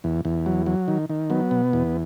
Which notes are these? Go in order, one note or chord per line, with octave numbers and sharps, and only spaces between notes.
E2
E2
F#3
F#3
D#3
D#3
F#3 B3
B2
E2